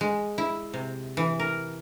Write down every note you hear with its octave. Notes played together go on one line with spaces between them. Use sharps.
G#3
E4
C3
E3
A#4